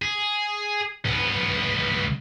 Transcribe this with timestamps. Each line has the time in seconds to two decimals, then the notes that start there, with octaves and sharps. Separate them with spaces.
0.02 G#4
1.05 C#2 B3